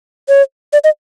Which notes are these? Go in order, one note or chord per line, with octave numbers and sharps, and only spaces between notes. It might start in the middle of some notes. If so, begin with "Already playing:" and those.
C#5
D5
D#5